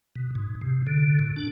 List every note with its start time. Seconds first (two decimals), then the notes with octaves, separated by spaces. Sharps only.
0.16 B2
0.35 G#2
0.61 C3
0.87 D3
1.19 A2
1.37 D4